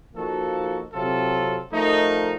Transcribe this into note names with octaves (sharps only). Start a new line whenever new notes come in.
F3 A#3 D#4 F#4 A4
C3 F#3 C4 F4 A4
F3 A3 D#4 A#4